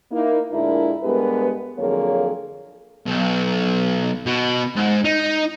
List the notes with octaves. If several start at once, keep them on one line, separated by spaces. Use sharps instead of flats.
A#3 D#4 E4
D2 A#2 G#3 D4 E4 A#4
G2 G#3 B3 G4 A#4 B4
F2 D3 F#3 A#3 G#4 C#5
B1
B2
G#2
D#4